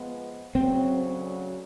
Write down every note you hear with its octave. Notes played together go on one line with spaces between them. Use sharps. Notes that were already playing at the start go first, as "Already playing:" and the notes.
Already playing: F3 G#3 B3
D2 C#3 F#3 C4